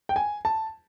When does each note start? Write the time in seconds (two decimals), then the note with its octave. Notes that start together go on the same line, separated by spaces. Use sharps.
0.09 G5
0.16 G#5
0.45 A5